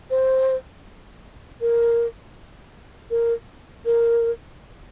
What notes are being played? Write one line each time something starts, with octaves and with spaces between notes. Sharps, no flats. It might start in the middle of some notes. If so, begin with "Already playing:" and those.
C5
A#4
A#4
A#4